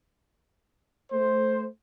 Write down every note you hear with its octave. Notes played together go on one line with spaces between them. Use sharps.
A3 C5